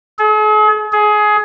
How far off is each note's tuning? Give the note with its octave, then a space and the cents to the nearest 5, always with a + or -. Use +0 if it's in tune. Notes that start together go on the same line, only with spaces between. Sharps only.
G#4 +45
G#4 +20